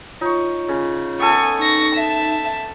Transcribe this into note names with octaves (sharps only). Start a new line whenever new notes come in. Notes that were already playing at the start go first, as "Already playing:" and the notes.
D#4 F4 C#5 C#6
C#3
B3 A4 G#5 C#6
D#4 C#6 A#6
E5 A5